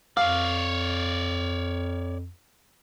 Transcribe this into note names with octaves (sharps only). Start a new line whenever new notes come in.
F2 C#5 D5 F5